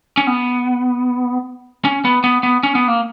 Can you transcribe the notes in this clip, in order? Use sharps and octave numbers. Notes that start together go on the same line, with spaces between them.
C#4
B3
C#4
B3
B3
B3
C#4
B3
A#3